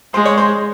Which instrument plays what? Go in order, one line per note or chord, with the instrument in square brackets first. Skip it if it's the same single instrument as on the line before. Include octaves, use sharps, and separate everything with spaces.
[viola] G#3 [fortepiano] C5
[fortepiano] C#5
C5